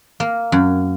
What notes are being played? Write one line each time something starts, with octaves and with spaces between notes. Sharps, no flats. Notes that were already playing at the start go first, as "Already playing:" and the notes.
A#3
F#2